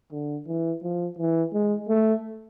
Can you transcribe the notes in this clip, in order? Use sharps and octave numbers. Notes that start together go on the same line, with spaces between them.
D3
E3
F3
E3
G#3
A3